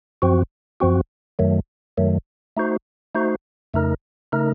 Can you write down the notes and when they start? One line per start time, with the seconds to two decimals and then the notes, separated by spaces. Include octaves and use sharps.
0.22 F#2 F3 C4 F#4
0.80 F#2 F3 C4 F#4
1.39 F#2 D#3 F#3 A3
1.97 F#2 D#3 F#3 A3
2.57 A3 D#4 F#4 C5
3.15 A3 D#4 F#4 C5
3.74 F2 C#3 A3 D#4 A#4
4.32 C#3 A3 D#4 A#4